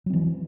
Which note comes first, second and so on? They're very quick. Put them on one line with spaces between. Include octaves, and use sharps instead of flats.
F#3 C4 E3